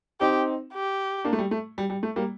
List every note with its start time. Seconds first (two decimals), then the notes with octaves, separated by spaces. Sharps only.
0.20 C4 D#4 G4
0.73 G4
1.25 A#3 D4
1.33 A3
1.39 G3
1.51 A3
1.78 G3
1.90 G3
2.03 A3
2.16 G3 A#3